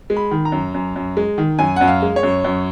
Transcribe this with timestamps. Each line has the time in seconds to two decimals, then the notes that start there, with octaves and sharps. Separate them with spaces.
0.10 G#3
0.16 B5
0.31 D#3
0.45 A#5
0.52 F#2
0.74 F#2
0.96 F#2
1.17 G#3
1.38 D#3
1.59 F#2 G#5
1.76 F#2 F#5
1.88 F5
2.02 G#3
2.16 C#5
2.23 F#2
2.45 F#2